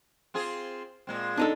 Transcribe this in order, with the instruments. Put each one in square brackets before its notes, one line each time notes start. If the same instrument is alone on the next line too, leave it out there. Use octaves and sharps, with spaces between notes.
[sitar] C4 F4 G#4
A#2 G#3 C4
[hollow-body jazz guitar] D4 D#4 A4